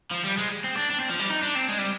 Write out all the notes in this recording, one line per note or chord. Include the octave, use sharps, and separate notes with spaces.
F3
G3
G#3
C4
D4
D4
C4
F3
G3
D#4
D4
C4
G#3
G3